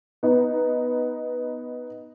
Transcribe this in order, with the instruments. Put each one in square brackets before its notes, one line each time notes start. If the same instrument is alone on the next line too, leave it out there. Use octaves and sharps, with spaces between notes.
[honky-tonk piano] B3 D#4